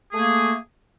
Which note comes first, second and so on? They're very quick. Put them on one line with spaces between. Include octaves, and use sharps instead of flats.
G#4 A3 A#3